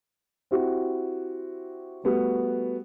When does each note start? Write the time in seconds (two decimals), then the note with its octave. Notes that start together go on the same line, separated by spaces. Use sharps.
0.51 C4 E4 F#4 G4
2.03 G3 A3 B3 F#4 F#5